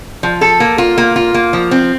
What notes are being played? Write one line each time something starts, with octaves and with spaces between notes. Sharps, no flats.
F3
A4
A#3
F4
A#3
F4
A#3
F3
C4